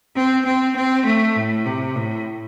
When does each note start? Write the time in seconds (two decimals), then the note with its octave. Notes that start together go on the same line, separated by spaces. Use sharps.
0.16 C4
0.46 C4
0.76 C4
1.05 A3
1.36 A2
1.66 C3
1.96 A2